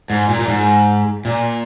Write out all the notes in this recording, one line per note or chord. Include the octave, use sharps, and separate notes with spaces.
G#2
A#2
A#2
G#2
A#2